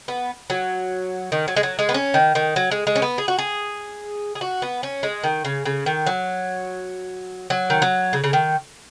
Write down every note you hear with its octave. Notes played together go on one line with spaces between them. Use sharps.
B3
F#3
D#3
F#3
G#3
F#3
G#3
B3
C#4
D#3
D#3
F#3
G#3
G#3
C#4
B3
G#4
F#4
G#4
G#4
F#4
B3
C#4
G#3
D#3
C#3
C#3
D#3
F#3
F#3
D#3
F#3
C#3
C#3
D#3